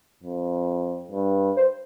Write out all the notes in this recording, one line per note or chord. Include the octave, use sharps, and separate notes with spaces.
F2
G2
C5